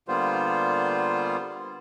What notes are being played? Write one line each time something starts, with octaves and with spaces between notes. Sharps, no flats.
D3 G3 A#3 B3 F4 C5